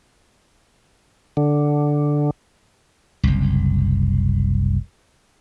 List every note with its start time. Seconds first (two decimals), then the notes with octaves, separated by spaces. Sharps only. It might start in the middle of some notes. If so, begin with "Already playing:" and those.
1.37 D3
3.23 F#1 C2